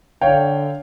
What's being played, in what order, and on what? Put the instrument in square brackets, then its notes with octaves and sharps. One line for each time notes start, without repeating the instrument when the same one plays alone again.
[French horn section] D3 [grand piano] C#5 F5 G5